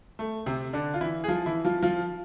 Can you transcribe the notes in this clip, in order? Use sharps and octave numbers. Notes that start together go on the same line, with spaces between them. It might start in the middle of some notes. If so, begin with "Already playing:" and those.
A3
C3 C4
D3 D4
F4
E3 E4
G#4
F3 F4
E3 E4
F3 F4
F3 F4